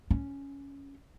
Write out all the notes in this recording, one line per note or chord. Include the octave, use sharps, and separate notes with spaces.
C#4